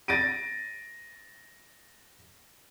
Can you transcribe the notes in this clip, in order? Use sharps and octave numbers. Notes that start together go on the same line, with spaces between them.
A6 A#6 D7 D#7